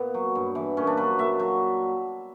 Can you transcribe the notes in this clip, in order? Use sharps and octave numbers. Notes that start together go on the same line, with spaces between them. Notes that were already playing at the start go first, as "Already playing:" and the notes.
Already playing: A#2 B3
F#3
G2
E3
A#2 C#4
D4
F#3 B4
A#2 E5
F#3